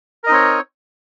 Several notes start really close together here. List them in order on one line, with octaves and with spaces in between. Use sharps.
A#4 D#5 D#4 C4 C#5